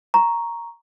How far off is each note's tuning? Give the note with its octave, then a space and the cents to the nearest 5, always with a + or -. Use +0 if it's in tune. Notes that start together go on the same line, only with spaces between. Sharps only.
A#5 +0 C#6 +0